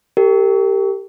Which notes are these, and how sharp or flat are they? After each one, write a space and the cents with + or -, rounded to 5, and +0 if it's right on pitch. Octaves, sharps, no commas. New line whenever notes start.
G4 +0 A#4 -45